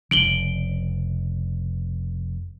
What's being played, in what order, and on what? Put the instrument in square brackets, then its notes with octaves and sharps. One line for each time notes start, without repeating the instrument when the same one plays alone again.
[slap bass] F1 C#3 [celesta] D7 F#7 G7